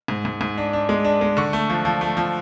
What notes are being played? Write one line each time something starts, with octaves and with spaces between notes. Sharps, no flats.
G#2
G#2
G#2
D4
D4
G#3
D4
G#3
D3 C#6
A3
F3
F3
A3
F3